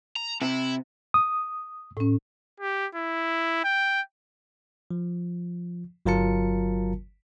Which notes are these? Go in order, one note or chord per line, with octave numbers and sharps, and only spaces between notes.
A#5
C3 E4
D#6
A2 C#4
G4
E4
G5
F3
G1 F#3 F4 A#4 A5 C#7